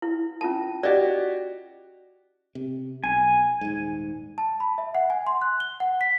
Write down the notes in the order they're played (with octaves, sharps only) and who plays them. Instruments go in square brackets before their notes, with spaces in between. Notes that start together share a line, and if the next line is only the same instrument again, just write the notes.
[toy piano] E4
C#4 F4 A5
[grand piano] F#4 G4 [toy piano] D5 D#5
[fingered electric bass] C3
[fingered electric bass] B1 [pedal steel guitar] G#5
[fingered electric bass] D#1 G#2
[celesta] A5
B5
E5
F#5
G#5
C6
F#6
G7
F#5
B6